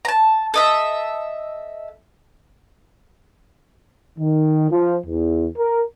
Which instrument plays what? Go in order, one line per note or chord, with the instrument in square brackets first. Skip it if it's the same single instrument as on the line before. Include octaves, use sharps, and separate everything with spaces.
[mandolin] A5 A#5
A4 D#5 E5
[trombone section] D#3
F3
E2
A#4